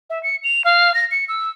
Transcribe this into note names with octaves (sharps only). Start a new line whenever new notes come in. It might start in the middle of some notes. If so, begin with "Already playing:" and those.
E5
C#7
F7
F5
A#6
C#7
E6